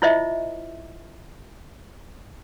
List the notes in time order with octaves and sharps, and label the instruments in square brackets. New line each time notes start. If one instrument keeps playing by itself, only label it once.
[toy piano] E4 F4 C5 D#5 E5